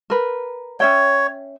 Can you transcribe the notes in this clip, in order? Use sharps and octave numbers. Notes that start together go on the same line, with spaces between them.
A#4 B4
C#4 C#5 E5 G5